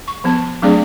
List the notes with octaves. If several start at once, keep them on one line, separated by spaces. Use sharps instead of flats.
C#6
F3 B3 A5
F#3 A3 C4 D4 G#4 D5